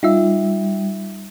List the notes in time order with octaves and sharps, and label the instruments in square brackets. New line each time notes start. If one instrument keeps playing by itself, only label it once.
[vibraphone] G3 [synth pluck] D#4 F4 E5